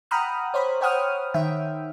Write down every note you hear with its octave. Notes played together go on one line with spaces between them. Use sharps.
F#5 G5 A#5 B5 D#6 F6
C5 C#5 B5
C5 C#5 F#5 G5 D#6 F6
D#3 E5 G5